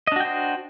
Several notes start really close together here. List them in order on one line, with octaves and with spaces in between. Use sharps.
D#5 D4 F#4 G5 C5